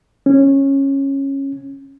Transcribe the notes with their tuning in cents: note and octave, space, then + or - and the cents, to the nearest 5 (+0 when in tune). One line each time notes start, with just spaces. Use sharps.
C#4 -15